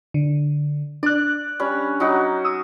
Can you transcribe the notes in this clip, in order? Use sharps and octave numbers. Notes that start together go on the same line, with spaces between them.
D3
D4 D5 F#6
G3 C#4
F#3 D#4 F#4
D#6 E6